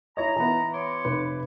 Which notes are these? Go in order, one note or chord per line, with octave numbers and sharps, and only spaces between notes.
E4 C#5 D#5 A#5
E3 B3
C#5 C6 D6
F1 B4